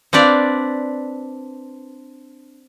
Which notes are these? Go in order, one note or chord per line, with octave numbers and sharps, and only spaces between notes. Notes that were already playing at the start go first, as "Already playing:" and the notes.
C4 D4 B4 D5 F5